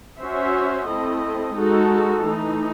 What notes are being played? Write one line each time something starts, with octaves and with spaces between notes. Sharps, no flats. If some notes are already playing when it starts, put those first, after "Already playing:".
C#4 F#4 C5 E5
A3 C4 E4 A4 D#5
G#3 D#4 F#4 A4
E3 A3 D#4